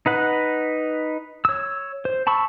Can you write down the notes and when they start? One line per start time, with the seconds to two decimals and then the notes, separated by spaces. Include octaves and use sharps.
0.06 D#4 B4 F#5
1.45 C#5 E6
2.05 C5
2.27 A5 B5 C#6 E6